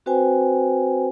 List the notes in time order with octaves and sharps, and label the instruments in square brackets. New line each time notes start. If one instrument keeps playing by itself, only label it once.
[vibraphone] C4 F#4 B4 C5 G5 G#5